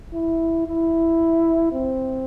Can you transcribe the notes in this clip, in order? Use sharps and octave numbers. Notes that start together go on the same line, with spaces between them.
E4
E4
C4